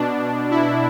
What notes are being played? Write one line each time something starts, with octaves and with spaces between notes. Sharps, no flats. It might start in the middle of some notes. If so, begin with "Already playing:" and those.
Already playing: B2 D4
E4